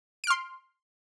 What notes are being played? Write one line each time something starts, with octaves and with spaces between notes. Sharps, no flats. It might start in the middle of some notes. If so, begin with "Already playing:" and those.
C6 F6 D7